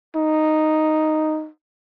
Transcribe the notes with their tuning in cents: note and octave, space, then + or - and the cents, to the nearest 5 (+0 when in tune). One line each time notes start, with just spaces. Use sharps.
D#4 -5